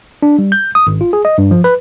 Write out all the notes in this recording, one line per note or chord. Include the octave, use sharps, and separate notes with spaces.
D4
G3
G6
D#6
G#1
F4
G#4
D#5
G2
F3
B4